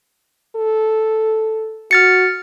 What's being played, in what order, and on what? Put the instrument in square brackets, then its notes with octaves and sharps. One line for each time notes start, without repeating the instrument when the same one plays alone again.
[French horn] A4
[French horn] F#4 [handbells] F6 A6 C#7